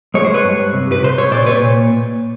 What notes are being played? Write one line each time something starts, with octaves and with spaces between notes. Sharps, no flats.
G#3 C#5
C5
B4 C#5
G2
C3
B4
C3 C5
C#5
A#2 C5 D5
B4 C#5
A#2